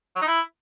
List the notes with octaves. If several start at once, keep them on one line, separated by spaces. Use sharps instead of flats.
F#3
D#4
E4